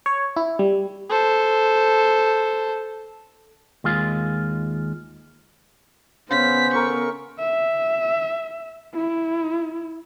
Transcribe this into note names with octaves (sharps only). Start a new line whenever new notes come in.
C#5
E4
G3
A4 C5
D#2 G#3 F4
C#3 B3 C5 B6
A4 A#4 C#6
E5
E4